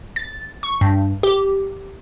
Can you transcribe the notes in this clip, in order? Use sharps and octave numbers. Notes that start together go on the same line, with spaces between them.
A6
C#6
G2
G4